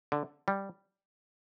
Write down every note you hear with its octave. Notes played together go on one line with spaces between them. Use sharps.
D3
G3